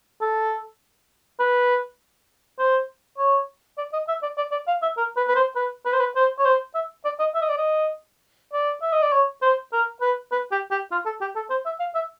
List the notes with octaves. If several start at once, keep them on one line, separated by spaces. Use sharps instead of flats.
A4
B4
C5
C#5
D5
D#5
E5
D5
D5
D5
F5
E5
A#4
B4
B4
C5
B4
B4
C5
B4
C5
C#5
C5
E5
D5
D#5
E5
D#5
D5
D#5
D5
E5
D#5
D5
C#5
C5
A#4
B4
B4
G4
G4
F4
A4
G4
A4
C5
E5
F5
E5